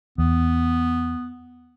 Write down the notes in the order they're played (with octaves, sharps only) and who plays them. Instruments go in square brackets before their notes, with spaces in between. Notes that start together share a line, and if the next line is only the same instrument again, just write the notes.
[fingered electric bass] E2 [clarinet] B3